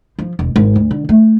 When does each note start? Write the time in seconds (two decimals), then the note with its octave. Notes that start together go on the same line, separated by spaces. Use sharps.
0.19 F3
0.39 E1
0.56 G#1
0.76 D2
0.91 D3
1.09 A3